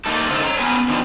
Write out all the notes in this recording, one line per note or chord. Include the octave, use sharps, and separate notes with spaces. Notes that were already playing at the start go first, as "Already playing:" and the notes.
A3 A#3 D#4 A4
C#3 C4 D#4 G#4 A4
C#5 A#5
F#3 B3 C#4 B4 G5 G#5
B2 D3 D#3 F3